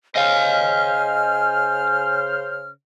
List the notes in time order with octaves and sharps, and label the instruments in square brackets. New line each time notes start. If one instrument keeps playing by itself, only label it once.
[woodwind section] C#3 C5 F6 [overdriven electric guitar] D#5 F5 [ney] G#5